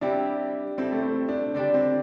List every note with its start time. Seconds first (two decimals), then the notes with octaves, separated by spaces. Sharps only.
0.01 G3 C4 D4 E4 G4
0.78 G3 C4 E4 A4
0.93 A3
1.03 C4
1.29 D4
1.54 D3 G3 D4 G4
1.74 C4